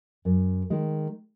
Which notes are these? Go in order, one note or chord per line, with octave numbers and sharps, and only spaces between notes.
F#2
D#3 G#3